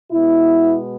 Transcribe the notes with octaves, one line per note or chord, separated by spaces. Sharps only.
B2 G#3 B3 E4